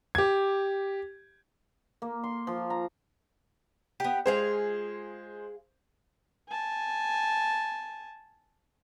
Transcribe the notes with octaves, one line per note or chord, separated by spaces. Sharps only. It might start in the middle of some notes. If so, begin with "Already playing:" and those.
G4 G#6
A#3
C6
F3
A#5
B3 G4
G#3 F4 G#4 C5 F5
G#5 A5